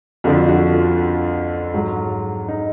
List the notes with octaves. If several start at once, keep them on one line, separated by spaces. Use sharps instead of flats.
F2 D3 F3 F#4
F#4
F4
G#2 F#3
D#4